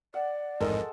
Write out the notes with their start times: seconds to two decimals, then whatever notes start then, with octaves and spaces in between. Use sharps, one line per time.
0.14 D5 F#5
0.60 A1 F2 G#2 G#3 A4 A#4 D#5 A5